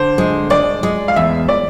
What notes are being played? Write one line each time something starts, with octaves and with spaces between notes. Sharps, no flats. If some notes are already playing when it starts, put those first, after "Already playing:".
Already playing: D3 C5
G#3
G#3 D5
G#3
F5
E2 E5
D5